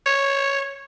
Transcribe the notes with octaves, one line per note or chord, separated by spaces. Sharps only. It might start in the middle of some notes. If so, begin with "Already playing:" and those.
C#5